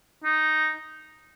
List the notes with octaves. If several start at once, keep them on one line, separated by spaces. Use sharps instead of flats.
D#4